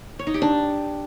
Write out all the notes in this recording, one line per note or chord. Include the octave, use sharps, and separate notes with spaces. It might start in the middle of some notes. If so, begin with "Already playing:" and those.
C#5
D#4
G4
D4